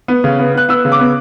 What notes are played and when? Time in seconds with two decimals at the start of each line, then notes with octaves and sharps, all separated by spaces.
0.08 B3
0.24 C#3
0.39 B3
0.55 B3 F#6
0.69 B3 E6
0.85 C#3
0.92 D6
0.99 B3